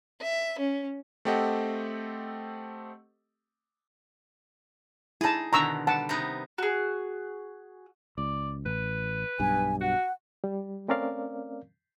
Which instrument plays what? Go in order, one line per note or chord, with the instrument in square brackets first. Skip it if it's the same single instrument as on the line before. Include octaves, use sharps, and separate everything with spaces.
[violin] E5
C#4
[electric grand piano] A3 C4 G4 A4 D#5 F#5
[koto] D#4 G#4 [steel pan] E4 A5
[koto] B2 D3 D#3 [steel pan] A#5 C#6 E6
[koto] G3 [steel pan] F#5 A5
[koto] C3 B3 D#4
[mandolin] F#4 G#4
[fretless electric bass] C#2 [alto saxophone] D5
[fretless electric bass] A1 [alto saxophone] B4
[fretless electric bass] B1 G2 [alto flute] G#5
[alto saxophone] F#4 [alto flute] F#5
[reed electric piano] G3
A3 C4 C#4 A#4 D5 F5